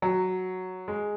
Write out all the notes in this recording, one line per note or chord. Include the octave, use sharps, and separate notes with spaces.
F#3
G#3